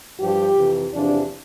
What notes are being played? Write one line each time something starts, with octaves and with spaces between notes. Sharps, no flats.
G2 F3 G4
F2 C3 E3
E2 C3 F3 D4